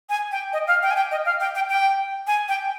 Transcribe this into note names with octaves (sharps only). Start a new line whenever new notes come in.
G#5
G5
D#5
F5
G5
G#5
G5
D#5
F5
G5
G5
G5
G#5
G5